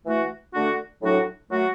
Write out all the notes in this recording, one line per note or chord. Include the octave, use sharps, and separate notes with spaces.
E3 A3 F#4
D3 A3 D4 F#4
A2 F#3 D4 F#4
F#3 A3 F#4